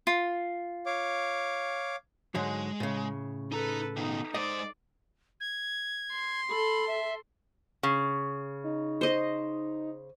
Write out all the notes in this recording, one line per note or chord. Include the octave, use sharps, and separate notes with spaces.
F4
C#5 F5 D6
G#2 D3 F#3 G#3
A2 C#3
D#4 A4 B4 A#5
B2 D#3 D#4
G#2 C5 D5 D#5
G#6
C6
A4 B5
E5
C#3
D#4
C5 D#5